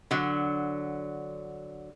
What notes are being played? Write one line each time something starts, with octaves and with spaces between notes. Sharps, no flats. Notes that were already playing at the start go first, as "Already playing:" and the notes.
D3 F#3